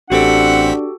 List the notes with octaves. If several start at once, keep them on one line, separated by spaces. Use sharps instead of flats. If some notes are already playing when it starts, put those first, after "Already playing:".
A1 C4 D4 F#4 G4 A4 F#5 B6